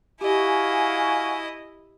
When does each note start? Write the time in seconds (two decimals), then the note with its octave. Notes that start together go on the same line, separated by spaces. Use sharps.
0.21 E4 F#4 G4 D#5 F5 G#5